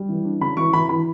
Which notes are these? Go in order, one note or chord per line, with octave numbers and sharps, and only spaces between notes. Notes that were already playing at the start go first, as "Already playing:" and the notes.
Already playing: G3
E3
D4
C#3 B5
E3 C#6
E3 B5
E3 B5